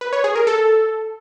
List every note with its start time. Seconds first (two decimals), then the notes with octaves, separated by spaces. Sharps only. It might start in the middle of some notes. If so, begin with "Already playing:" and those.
0.01 B4
0.13 C#5
0.24 G#4
0.35 A#4
0.47 A4